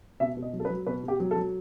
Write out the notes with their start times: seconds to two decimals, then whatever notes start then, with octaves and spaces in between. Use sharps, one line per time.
0.20 B2 E5
0.37 B2
0.42 D#5
0.53 F#3
0.60 A4
0.65 B4
0.70 F#3
0.87 B2 B4
1.03 B2 G4
1.20 F#3
1.31 A4
1.36 F#3